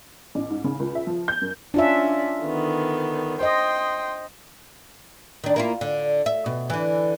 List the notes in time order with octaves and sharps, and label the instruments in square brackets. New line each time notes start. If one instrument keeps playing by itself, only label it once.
[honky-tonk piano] A1
G#2
C#3
C#2
E5
F3
G6
F#2
[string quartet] C#4 D5 [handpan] D4 F4 E5
[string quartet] D3 D#3 B3
[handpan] C5 D#5 [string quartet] G5 C6 D#6
[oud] D#3 D4
A#3 E4 F4
D3
E5
B2
D3 E3